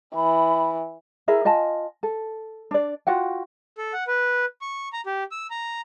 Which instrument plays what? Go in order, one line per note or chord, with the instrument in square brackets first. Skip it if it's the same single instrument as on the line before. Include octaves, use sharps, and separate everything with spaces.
[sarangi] E3 [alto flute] B5
[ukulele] E4 G#4 A#4 E5
F4 D#5 G#5 A5
A4
D4 D5
F4 F#4 F#5 G5
[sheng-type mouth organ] A4
F#5
B4
C#6
A#5
G4
E6
A#5